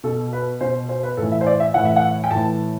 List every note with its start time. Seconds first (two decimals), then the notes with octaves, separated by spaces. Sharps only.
0.04 B2 A4
0.33 B4
0.61 B2 C5
0.89 C5
1.03 B4
1.17 A2 E3 A4
1.32 E5
1.41 C5
1.47 D5
1.60 E5
1.74 A2 E3 F#5
1.85 E5
1.96 F#5
2.24 G5
2.31 A2 E3 A5